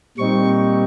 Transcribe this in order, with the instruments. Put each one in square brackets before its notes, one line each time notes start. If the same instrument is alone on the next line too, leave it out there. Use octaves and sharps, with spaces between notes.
[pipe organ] A#2 G3 C4 D#4 C#6